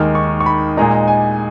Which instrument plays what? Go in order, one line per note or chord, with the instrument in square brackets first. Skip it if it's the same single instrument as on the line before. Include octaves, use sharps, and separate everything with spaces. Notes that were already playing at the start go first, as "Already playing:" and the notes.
Already playing: [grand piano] D#2 D#3 G#3 F6
C#6
C#6
B5
A#2 G#3 D#4 A#5
G#5